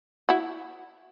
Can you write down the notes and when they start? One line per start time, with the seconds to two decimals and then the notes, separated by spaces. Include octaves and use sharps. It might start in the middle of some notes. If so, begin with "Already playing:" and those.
0.29 E4 F#4